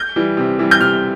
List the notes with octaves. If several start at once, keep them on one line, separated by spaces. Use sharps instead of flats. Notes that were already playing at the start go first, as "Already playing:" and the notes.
Already playing: G6
E3 G3
C3
E3 G3
G6
C3 F6